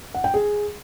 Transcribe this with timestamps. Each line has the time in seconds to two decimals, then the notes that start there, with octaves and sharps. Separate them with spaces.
0.15 F#5
0.24 G5
0.34 G#4